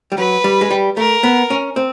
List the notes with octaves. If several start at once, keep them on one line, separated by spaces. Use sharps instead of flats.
G3
F#3 B4
G3
G#3
G3
A3 A#4
B3
C#4
C4